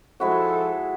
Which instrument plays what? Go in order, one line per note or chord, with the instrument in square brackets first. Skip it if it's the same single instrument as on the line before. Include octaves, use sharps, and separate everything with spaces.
[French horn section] F3 A4 C5 [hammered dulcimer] G#3 E4 F#4